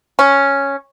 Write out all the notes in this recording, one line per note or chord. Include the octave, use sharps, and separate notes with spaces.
C#4